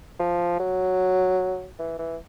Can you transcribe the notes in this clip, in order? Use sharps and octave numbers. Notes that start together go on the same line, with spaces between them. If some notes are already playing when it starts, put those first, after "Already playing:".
F3
F#3
E3
E3